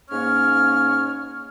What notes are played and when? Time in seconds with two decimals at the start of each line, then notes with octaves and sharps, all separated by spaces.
0.11 G#2 A#3 C#4 C#5 F6